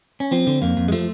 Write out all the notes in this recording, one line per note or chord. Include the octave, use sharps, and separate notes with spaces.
C#4
F3 C4
D3
F2 A#3
F2
G#3
F3 A3